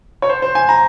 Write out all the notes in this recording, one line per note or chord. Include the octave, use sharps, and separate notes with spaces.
C#5
C5
C5
G#5
A#5